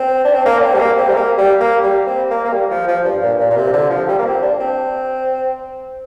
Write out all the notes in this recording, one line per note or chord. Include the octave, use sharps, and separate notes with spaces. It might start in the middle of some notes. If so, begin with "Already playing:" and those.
Already playing: C4
D4
C4
A#3
D4
C4
G3
A#3
C4
G3
A#3
G3
A#3
G3
C4
A#3
A#3
G3
F3
F3
G2
A#2
A#2
A#2
C3
D3
F3
G3
A#3
C4
D4
C4